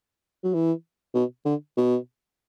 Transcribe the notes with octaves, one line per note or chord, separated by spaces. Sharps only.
F#3
E3
B2
D3
B2